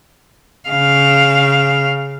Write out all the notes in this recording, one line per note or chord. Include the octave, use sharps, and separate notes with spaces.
C#3 F5